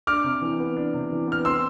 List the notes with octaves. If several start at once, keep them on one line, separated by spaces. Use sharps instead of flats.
D4 D6 F6
C3
E3
B3
D4
C3
E3
B3 F6
C4 C6 E6